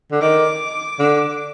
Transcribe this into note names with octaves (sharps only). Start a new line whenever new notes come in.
D3
D#3 D6
D3